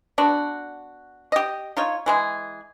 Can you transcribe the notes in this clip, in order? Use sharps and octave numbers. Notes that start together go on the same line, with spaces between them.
B3 D4 F#4
G4 D#5
D#4 F4 C#5
E3 G#3 G#4